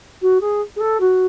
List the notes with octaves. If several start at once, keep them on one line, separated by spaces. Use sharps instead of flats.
F#4
G#4
G#4
A4
F#4